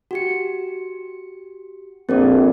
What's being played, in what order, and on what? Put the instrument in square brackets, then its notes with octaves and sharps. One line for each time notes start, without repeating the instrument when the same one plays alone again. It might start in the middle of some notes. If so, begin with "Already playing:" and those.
[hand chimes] F#4 G4 C#7
[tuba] A#1 [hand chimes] C4 A4 D5